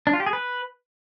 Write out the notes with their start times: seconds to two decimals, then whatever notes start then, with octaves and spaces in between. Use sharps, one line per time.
0.07 D4
0.13 F4
0.20 G4
0.26 G#4
0.33 B4